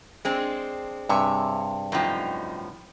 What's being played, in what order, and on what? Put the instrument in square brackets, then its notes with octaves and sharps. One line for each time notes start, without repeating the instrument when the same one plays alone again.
[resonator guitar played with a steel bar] G#3 C4 D4
[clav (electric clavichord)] G2 C3 [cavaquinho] C#5 E5 G#5
[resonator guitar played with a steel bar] F#2 A2 F3 [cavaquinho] D#4 G5